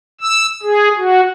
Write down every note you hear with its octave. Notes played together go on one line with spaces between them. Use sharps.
E6
G#4
F#4